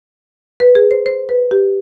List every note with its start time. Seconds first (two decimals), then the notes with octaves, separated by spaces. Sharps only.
0.60 B4
0.75 G#4
0.91 C5
1.06 C5
1.29 B4
1.51 G4